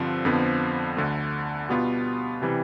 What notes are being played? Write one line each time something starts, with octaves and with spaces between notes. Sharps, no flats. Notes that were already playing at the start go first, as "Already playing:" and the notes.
Already playing: G2 D3 F3 C4
F2 D3 F3 B3
D2 D3 A3
B2 G3 B3 F4
C3 E3 G3